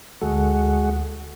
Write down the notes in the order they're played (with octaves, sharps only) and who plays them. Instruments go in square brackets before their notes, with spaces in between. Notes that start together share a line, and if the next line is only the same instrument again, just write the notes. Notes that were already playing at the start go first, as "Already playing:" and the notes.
[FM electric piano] D2 A4 [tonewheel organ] G#3 F#4